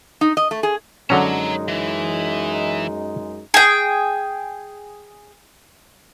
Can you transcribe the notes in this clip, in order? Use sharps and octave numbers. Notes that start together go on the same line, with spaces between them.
D#4
D#5
A3
G#4
F#2 D3 F#3 G#3 C#4 D#4 C#5 A#5
E3
G#4 G5